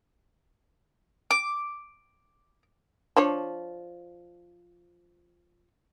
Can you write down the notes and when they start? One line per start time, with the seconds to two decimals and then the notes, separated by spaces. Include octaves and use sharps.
1.31 D6
3.16 F3 D4 C#5